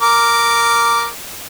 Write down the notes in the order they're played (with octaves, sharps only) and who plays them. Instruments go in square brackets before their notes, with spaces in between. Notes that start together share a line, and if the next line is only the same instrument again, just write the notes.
[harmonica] A#4 D6